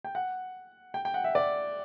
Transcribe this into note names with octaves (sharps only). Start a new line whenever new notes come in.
G5
F#5
G5
G5
F#5
E5
D5